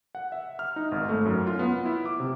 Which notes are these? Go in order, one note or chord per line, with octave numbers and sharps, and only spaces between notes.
F#5
E5
F6
D#4
G#1
A3
F#2
F4
B3
E4
D6
C3